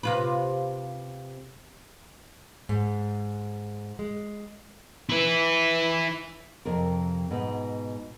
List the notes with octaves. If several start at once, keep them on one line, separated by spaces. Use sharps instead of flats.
C3 F4 B4
G#2
G#3
E4 B4
F2 C3 A#4
G#2 B2 B4